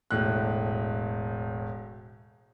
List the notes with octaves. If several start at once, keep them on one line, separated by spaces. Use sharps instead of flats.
E1 A2 F#6